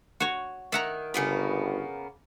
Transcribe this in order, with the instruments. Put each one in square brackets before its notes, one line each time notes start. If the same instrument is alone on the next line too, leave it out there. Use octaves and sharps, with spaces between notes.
[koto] F#4 C#5
[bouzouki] D#3 [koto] E5 F#5 A#5
[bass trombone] G1 [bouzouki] C#3 A#3 B3